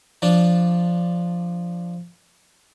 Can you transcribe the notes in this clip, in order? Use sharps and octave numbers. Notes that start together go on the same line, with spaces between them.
F3 D4